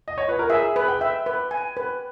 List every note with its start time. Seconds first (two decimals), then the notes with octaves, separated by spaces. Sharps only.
0.08 D#5
0.18 C#5
0.29 B4
0.39 A#4
0.50 G#4 E5
0.76 B4
0.88 G5
1.01 E5
1.26 B4
1.51 G#5
1.77 B4